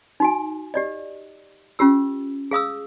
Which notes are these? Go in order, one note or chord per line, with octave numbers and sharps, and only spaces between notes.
D#4 F#4 G#5
G4 D5 D#5
C#4 F4 G4 E6
G#4 F5 D#6 E6